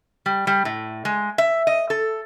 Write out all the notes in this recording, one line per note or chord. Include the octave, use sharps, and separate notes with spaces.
G3
G3
A2
G#3
E5
D#5
A4